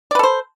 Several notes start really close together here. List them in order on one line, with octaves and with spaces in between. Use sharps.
D5 B4 A4 C5